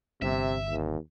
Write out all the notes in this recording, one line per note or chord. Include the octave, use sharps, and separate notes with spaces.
G1 C3 E5
D#2